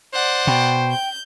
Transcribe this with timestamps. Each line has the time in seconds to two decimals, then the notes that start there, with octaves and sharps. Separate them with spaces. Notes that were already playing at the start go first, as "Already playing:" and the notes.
0.14 C5 D5 F#5
0.47 B2 G5
0.91 G6